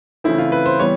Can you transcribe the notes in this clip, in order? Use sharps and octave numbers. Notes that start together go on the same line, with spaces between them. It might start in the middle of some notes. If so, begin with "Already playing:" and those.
C#3 E3 A3 C4 E4
F4
B4
C5
E3 G3 B3 C#5